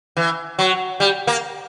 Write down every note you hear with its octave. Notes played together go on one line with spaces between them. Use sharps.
E3
F#3
G3
A#3